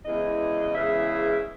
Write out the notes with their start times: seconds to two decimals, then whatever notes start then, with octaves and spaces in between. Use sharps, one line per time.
0.05 E2 C#3 E3 G#3 D#5
0.75 E2 C#3 E3 G#3 E5